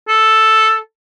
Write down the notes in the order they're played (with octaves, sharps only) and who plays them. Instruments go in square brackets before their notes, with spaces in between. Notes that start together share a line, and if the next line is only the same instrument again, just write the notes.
[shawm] A4